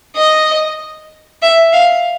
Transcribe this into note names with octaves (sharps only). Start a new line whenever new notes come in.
D#5
E5
F5